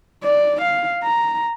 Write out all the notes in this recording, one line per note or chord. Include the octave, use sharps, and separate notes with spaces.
D5
F5
A#5